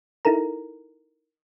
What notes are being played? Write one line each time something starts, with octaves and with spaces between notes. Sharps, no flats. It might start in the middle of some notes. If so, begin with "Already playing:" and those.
D#4 E4 A4 A#4 A#5